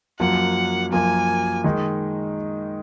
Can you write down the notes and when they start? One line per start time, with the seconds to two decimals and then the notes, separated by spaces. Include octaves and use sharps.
0.20 F#2 F3 A#3 F#5
0.92 F#2 F3 A#3 G#5
1.64 D#3 G#3 D#4